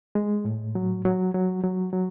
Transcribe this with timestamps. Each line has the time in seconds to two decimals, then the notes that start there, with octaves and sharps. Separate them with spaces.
0.15 G#3
0.45 A2
0.75 F#3
1.05 F#3
1.34 F#3
1.64 F#3
1.93 F#3